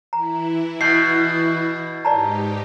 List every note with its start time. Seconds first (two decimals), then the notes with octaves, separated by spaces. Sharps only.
0.13 E3 E4 A#5
0.81 B2 G6 C7
2.05 G#2 D#4 G4 D5 A5 A#5